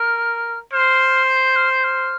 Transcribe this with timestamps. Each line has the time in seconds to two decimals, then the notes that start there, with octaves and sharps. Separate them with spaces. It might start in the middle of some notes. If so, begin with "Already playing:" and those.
Already playing: A#4 F6
0.72 C5 F6
1.28 G6
1.56 F6
1.72 G6
1.84 F6